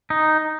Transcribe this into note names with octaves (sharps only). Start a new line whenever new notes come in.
D#4